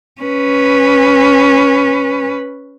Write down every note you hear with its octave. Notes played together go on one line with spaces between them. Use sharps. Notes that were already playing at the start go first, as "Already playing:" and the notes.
C#4 B4